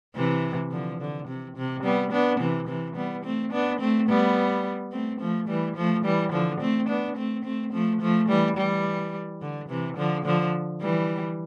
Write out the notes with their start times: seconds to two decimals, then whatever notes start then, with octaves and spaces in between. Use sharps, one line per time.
0.15 C3 E3
0.71 D3 F3
1.00 D3
1.28 C3
1.56 C3
1.84 G3 B3
2.12 B3 D4
2.40 C3 E3
2.68 C3 E3
2.96 G3 B3
3.24 A3 C4
3.52 B3 D4
3.80 A3 C4
4.08 G3 B3
4.92 A3 C4
5.20 F3 A3
5.48 E3 G3
5.76 F3 A3
6.04 E3 G3
6.32 D3 F3
6.60 A3 C4
6.89 B3 D4
7.17 A3 C4
7.44 A3 C4
7.72 F3 A3
8.01 F3 A3
8.29 E3 G3
8.57 E3 G3
9.41 D3
9.69 C3 E3
9.97 D3 F3
10.25 D3 F3
10.82 E3 G3